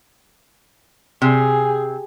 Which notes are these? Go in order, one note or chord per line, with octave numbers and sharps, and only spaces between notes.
C3 G#4